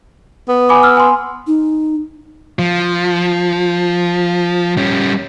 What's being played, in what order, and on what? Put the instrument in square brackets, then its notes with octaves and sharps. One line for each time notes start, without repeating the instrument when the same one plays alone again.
[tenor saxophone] B3
[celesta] G#5 B5 D6
E6 F6
G#5 C6
[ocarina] D#4
[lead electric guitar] F3
G3 C#4